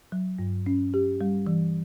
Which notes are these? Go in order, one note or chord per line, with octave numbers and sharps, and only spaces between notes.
F#3
G2
C#4
G4
G3
E3